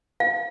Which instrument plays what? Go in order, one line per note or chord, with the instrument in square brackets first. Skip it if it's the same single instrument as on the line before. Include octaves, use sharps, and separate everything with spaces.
[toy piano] F5